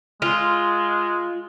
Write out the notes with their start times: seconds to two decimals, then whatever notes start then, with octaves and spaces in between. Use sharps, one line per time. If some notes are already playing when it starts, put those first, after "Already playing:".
0.22 G#3 F4